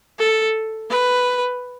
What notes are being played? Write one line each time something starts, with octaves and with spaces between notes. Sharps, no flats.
A4
B4